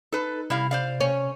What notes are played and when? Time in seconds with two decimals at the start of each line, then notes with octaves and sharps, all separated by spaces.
0.12 D#4 A4 B4
0.50 C3 G3 E4 F5
0.71 C5 D5 F5
1.01 C#4